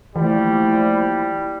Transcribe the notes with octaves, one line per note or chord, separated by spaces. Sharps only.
E3 F3 G3 A3 A#3 E4